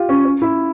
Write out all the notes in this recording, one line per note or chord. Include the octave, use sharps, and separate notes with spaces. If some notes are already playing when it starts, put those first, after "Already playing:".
Already playing: F4 G4
C#4
C#4
E4